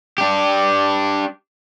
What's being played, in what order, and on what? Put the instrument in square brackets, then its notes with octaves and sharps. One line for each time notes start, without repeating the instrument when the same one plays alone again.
[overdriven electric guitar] D4 G4